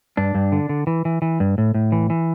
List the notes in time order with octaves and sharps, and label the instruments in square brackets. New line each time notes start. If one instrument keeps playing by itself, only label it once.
[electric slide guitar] G2 D4
G2
D3
D3
E3
E3
E3
G2
A2
A2
E3
E3